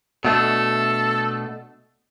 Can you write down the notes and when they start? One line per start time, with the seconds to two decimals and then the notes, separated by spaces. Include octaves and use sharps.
0.25 B2 A3 D4 A4